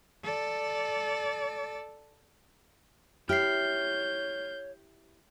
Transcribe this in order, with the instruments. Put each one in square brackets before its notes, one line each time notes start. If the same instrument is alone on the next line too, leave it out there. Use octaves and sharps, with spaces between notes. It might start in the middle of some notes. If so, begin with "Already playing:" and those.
[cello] A4 D5
[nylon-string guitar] E4 G4 [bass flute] C#5 [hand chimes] F6 C7 [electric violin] G6